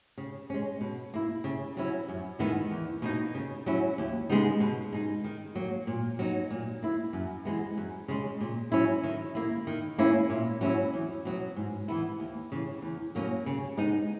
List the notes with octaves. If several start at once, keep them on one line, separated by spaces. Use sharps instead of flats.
C#3
G#3 C#4
B2
A#3 E4
C#3
F#3 C#4 E4
F#2
D#3 G#3 B3 E4
E2
B2 A#3 D#4
C#3
F#3 C#4 E4
D#2
C#3 G#3 B3 D#4
B2
G#3 D#4
D#3
F#3 A#3
A#2
F#3 B3 D#4
A#2
A#3 E4
F#2
E3 G#3 B3
F#2
C#3 G#3
A#2
F#3 C#4 E4
D#3
A#3 E4
D#3
A#3 C#4 E4
A#2
F#3 C#4 E4
E2
B2 F#3
G#2
E3 B3 E4
D#2
C#3 E3
E2
B2 F#3 A#3 C#4
C#3
G#3 B3 D#4